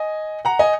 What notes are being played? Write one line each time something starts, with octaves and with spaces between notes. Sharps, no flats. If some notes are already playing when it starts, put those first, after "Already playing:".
Already playing: D#5 G#5
F#5 A#5
D#5 G#5